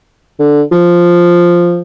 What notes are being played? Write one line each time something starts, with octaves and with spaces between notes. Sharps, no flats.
D3
F3